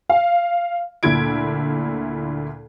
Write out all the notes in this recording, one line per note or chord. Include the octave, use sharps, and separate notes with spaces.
F5
D2 A#2 E4 G#6 D7